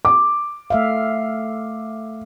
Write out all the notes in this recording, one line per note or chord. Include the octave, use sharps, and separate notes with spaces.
D6
A3 E5 F5